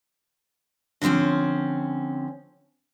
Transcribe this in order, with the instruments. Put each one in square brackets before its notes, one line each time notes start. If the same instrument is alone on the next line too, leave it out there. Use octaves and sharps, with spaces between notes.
[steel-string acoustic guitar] D3 F3 G3 C4 C#4